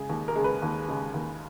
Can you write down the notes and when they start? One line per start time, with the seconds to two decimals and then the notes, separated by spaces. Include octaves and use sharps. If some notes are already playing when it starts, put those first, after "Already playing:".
Already playing: C#3 G#3 G#4
0.09 D#2
0.28 A#4
0.36 C#3 G#3
0.44 B4
0.62 D#2
0.88 C#3 G#3
1.14 D#2